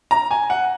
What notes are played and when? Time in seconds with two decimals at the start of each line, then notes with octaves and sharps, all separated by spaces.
0.11 A#5
0.31 G#5
0.50 F#5